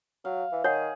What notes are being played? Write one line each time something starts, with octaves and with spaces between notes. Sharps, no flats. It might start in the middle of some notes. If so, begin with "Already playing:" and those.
F#3 F5
E3
D#3 G#4 C#5 F#5